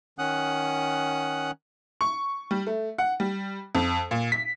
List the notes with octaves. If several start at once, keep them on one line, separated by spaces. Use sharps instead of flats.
D#3 C#4 F#5 D#6 F#6
C#6
G3
A3
F#5
G3
F2
A#2
B6